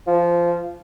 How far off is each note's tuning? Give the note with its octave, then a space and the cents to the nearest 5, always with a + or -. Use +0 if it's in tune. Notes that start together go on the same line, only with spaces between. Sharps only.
F3 -15